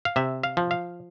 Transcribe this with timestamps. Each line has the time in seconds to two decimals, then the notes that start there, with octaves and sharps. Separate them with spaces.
0.05 F5
0.16 C3 E5
0.44 F5
0.57 F3
0.71 F5